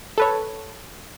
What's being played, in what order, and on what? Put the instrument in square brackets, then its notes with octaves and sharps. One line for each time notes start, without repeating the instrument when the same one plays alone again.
[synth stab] A4 B4 C#5